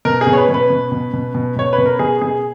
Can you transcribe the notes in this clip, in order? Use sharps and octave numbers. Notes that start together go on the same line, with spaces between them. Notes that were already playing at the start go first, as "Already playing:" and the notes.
B2 A#4
G#4
B2
C#5
B4
B2
B4
B2
B2
B2
B2
B2 C#5
B4
B2
A#4
B2 G#4
B2 G#4